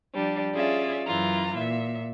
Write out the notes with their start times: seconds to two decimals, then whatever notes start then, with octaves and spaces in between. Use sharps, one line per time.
0.14 F3 G3 D4
0.54 C#4 F4 G#4 D5 E5
1.07 F#2 E3 F4 A#5
1.56 A#2 E5